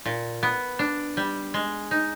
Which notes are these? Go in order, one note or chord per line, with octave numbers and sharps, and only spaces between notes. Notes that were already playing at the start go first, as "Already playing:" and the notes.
A#2
B3
D4
G3
G#3
D#4